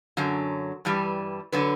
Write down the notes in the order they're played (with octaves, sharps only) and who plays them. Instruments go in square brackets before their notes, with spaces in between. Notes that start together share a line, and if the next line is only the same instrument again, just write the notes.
[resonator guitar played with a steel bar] F#2 D3 F#3
G2 E3 G3
D3 F#3 B4